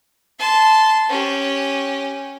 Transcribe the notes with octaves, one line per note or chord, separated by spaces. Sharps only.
A5 C6
C#4 G4